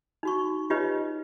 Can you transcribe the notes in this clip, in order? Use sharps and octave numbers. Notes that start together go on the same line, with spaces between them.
D#4 F#4 C#6
D#4 F4 G4 B4 C#5 D#5